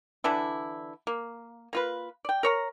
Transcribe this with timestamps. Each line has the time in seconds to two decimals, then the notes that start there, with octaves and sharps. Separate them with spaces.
0.24 D3 E3 D4 E4
1.07 A#3
1.73 A#3 F4 B4
2.25 D5 G5
2.43 A#4 C#5 A#5